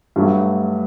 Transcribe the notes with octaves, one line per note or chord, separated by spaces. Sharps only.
G2 F#3 A3